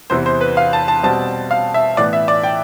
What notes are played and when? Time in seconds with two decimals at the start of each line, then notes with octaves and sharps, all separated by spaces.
0.10 E2 C3 E3 C5
0.26 C5
0.41 B4
0.57 F5
0.73 A5
0.88 A5
1.03 B2 G3 C4 A5
1.51 F5
1.74 E5
1.97 A2 E3 B3 D5
2.13 E5
2.28 D5
2.44 G5